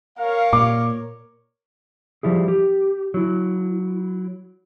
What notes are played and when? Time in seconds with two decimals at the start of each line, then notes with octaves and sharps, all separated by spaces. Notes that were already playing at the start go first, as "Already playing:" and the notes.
0.19 A#4 C#5 F5
0.53 A#2 D6
2.23 F3 G3 E4 G#4
2.48 G4
3.14 F#3 E4